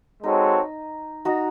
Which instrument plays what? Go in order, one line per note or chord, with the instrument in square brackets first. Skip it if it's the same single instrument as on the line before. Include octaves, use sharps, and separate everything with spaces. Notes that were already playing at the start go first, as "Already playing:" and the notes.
[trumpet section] G#3 C4 F#4 A4 C#5 [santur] D#4
[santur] D#4 F#4